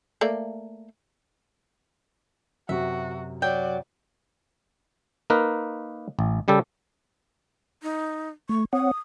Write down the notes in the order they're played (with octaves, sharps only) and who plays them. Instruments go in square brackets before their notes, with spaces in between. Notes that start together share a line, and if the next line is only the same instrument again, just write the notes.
[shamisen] A3 A#3 D5
[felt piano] F#2 C3 [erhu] F#4 [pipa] E5
[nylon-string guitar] F#3 [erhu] D5 [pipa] G5
[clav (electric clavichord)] A#3 D#4 A#4 B4
A1
C#3 G3 G4 A4
[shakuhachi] D#4
[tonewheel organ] A3 [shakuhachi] C#6
[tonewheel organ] C4 C#5 F#5 [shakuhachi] D#6